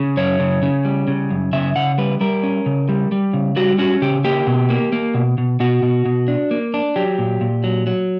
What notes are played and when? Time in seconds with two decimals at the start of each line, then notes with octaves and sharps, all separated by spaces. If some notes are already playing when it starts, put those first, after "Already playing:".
Already playing: C#3
0.17 F#2 C#5
0.39 C#3
0.62 C#3
0.85 G3
1.08 C#3
1.30 F#2
1.53 C#3 E5
1.76 C#3 F#5
1.98 G3 B4
2.21 G3 A#4
2.43 C#4
2.66 C#3
2.89 G3
3.12 G3
3.33 C#3
3.56 G3 F#4
3.79 C#4 F#4
4.02 C#3 G4
4.24 A#3 G4
4.47 B2
4.70 A#3
4.92 A#3
5.14 B2
5.38 B2
5.60 B2 F#4
5.83 B2
6.05 B2
6.28 D4
6.51 A#3
6.74 D4
6.96 F#3 G4
7.19 A#2
7.41 A#2
7.64 F#3
7.87 F#3